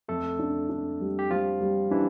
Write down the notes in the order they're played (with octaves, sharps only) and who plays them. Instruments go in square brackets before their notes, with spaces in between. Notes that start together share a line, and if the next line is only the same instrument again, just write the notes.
[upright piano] F2 [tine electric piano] A3 A4
[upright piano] D4
D4
G3
[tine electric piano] G4
[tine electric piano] F3 F4 [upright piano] G3
[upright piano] G3
[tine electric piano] E3 E4 [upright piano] D4